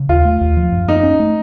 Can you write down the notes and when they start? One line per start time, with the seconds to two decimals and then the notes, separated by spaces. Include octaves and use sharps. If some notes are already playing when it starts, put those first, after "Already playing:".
Already playing: C#3
0.09 D#2 F4
0.25 A3
0.41 D#2
0.57 F3
0.72 F#2
0.88 A#3 D#4
1.03 C#4
1.19 A3